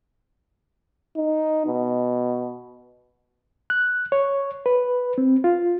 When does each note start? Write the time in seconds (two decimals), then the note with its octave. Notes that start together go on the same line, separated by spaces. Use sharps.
1.16 D#4
1.66 B2
3.70 F#6
4.12 C#5
4.66 B4
5.18 C4
5.44 F4